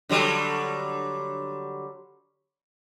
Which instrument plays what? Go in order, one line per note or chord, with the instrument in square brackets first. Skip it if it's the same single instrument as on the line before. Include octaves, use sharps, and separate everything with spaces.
[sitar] D3 F#3 G3